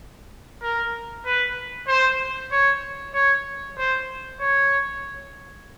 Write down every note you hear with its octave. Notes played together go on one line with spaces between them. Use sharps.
A#4
B4
C5
C#5
C#5
C5
C#5